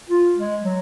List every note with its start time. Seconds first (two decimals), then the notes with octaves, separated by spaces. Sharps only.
0.10 F4
0.37 G#3
0.64 F#3